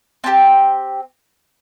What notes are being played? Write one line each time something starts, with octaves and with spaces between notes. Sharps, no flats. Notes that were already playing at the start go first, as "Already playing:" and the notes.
C4 D#4 G4 A5